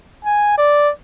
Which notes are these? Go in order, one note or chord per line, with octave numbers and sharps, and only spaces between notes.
G#5
D5